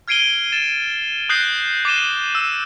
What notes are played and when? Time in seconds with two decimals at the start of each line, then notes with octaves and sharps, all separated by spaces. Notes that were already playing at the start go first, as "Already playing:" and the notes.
0.08 F6 G#6 C7 D7 D#7 G7
0.52 A6 E7
1.29 D#6 F#6 G6 A#6 C7
1.85 D6 A6 C7 D#7 E7 G7
2.35 E6